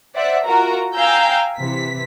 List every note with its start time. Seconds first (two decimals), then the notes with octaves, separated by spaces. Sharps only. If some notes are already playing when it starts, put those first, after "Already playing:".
0.15 C5 D5 E5 F#5
0.44 F4 F#4 A#4 A#5
0.94 F5 G5 G#5 A#5 E6 G6
1.59 C3 E3 B6